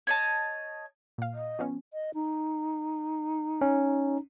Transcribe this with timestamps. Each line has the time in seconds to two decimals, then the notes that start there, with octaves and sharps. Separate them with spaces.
0.07 C#5 D#5 A5
1.18 A#2 F5
1.34 D#5
1.59 F3 B3 C#4
1.92 D#5
2.14 D#4
3.61 C#4